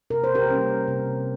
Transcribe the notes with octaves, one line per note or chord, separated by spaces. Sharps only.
C3 A#4
C5
G4 A#4
G3 A#3 C#4
C3